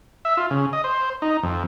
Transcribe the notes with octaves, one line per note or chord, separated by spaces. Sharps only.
E5
F4
C#3
D#5
C5
D#4
F2